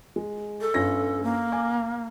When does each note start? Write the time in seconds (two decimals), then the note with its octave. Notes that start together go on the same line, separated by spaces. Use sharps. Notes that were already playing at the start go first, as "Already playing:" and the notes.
0.16 G#3
0.61 A4
0.74 G1 C#4 A#6
1.23 A#3
1.52 G#5 D6